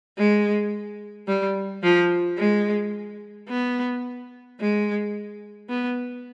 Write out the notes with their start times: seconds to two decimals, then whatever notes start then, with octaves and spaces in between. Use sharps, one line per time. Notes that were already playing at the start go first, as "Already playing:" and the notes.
0.18 G#3
1.28 G3
1.83 F3
2.38 G#3
3.49 B3
4.60 G#3
5.70 B3